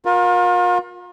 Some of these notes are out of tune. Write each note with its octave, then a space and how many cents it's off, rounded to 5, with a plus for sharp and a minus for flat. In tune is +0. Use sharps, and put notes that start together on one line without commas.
F4 +40 A#4 +25